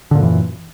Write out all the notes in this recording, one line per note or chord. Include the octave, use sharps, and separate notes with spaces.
F#2 A#2 D3 E3